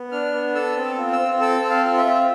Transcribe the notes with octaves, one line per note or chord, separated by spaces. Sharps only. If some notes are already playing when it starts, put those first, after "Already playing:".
Already playing: B3
D4 F6
B3
A4 E6
C4
F4
E6
C4
A4 E6
C4
F5
F4
E5
C4